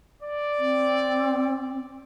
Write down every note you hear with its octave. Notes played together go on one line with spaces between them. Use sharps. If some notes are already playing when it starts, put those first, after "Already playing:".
D5
C4